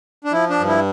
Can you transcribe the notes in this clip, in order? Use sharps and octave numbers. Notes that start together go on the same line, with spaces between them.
D4
F3 E4
D4
G2
E4